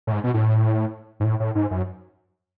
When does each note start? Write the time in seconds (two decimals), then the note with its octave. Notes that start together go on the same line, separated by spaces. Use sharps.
0.07 A2
0.12 G#2
0.24 B2
0.34 A2
1.20 G#2
1.24 A2
1.40 A2
1.55 G#2
1.71 F#2